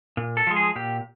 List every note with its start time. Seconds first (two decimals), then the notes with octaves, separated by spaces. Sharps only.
0.17 A#2
0.37 A4
0.47 F3 G#3
0.56 G#4
0.76 A#2 G4